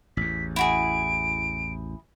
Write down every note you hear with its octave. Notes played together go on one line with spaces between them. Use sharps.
A1 E2 B6
E4 F#4 G#4 D7